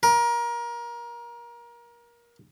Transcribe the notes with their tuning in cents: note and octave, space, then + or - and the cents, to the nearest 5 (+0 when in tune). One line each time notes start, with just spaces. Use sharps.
A#4 +25